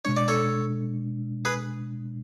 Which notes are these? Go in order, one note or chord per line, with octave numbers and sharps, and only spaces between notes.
B2 G#3 D4 C#5
D5
A4 C#5
G#4 B4